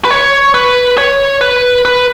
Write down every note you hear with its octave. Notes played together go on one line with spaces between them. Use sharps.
B4
C#5
B4
C#5
B4
B4